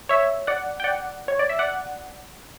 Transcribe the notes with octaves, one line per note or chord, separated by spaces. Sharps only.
C#5 E5
D5 F#5
G5
D5 F#5
C#5
D5
E5
D5 F#5